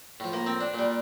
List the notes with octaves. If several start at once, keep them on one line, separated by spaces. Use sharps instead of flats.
A2 F3
A#3
C4
D4
A#2
G3